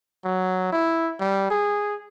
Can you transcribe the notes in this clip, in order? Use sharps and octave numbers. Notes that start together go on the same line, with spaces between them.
F#3
E4
G3
G#4